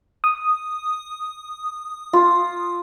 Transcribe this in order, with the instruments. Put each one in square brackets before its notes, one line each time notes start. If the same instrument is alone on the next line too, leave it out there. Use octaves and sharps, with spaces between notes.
[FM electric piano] D#6
[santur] F4 F5